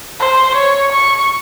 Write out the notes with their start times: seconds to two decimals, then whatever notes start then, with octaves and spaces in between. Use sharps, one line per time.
0.20 C5
0.54 C#5
0.91 C#6